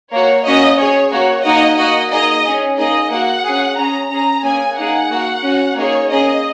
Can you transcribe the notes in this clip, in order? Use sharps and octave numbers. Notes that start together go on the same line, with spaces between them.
A#3 F#4 C#5
A#3 C#4 F#4 D#5
C#4 G#4 C#5
A#3 F#4 C#5
A#3 D#4 F#4 D#5
A#3 F#4 D#5
A#3 D#4 G#4 D#5
C#4 G#4
A#3 D#4 G#4 D#5
A#3 F#4 F#5
C#4 G#4
C#4 G#4 A#5
C#4 G#4 A#5
A#3 C#4 G#4 G#5
A#3 D#4 G#4 F#5
A#3 F#4
C#4 F#4
A#3 D#4 G#4 C#5
A#3 C#4 G#4 D#5